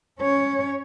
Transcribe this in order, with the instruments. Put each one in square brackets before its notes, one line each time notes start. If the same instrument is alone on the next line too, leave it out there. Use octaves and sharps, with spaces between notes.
[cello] C#4 C#5